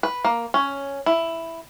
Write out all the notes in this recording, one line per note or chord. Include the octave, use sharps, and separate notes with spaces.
B4
A#3
C#4
E4